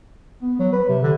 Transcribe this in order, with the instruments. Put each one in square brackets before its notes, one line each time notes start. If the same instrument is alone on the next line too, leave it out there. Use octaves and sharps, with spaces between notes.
[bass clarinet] B3
F#3
B4
C3
D3